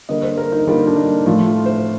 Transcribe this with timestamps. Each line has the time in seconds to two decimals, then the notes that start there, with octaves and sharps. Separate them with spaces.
0.09 D3 G3 A#3 D#5
0.23 C5
0.38 A#4
0.52 D#4
0.67 D3 G3 A#3 F4
0.87 D4
0.97 D#4
1.26 A2 F3 A3 F4
1.46 F4
1.66 C5